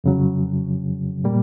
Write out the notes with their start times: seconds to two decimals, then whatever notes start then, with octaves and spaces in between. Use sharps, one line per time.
0.04 F2 C#3 F#3
1.24 A#2 G3 A#3